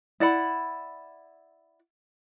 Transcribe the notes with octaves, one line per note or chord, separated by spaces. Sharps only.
E4 D5 F#5 B5